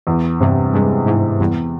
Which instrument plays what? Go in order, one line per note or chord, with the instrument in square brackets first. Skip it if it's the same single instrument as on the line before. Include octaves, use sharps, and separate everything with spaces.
[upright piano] E2
[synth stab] G2 [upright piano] C3
[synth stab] G2 [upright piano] G#3
[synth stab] G#2 [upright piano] E3
[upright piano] E2 [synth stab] G2